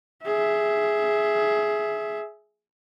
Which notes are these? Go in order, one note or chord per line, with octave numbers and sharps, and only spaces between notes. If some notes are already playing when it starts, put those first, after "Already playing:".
G#4 E5